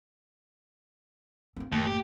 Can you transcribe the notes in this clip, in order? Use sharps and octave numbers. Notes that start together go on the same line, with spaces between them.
C4 F4
F#1 D#2 A2
G4